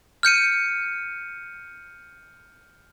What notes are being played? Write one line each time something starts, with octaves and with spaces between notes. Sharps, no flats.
F6 G6 C#7 D#7